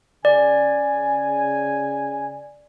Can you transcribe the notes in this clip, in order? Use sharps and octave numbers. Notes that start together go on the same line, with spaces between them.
C#3 D5 G#5